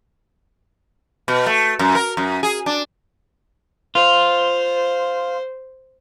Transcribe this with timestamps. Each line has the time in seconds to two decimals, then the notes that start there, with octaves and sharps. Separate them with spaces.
1.28 B2
1.46 A3
1.79 F#2
1.95 A#4
2.17 F#2
2.43 G#4
2.66 D4
3.95 F4 C5